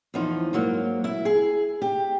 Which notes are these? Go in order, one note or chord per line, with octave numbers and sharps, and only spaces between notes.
E2 F3 D#4
G#2 F#3 A#3
E4 E5
G#4
G4